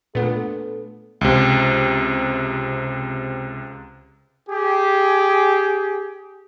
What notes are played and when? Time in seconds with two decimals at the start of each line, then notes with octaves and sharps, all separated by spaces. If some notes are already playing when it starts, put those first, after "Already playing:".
0.15 A#2 A3 B3 D4 A4 B4
1.21 C#2 C3
4.49 G4 G#4